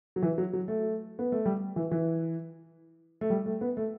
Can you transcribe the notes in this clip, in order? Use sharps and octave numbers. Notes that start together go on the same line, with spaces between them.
F#3
E3
F#3
F#3
A3
B3
A3
G3
E3
E3
A3
G3
A3
B3
A3